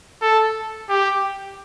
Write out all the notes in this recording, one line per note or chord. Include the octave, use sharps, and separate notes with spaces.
A4
G4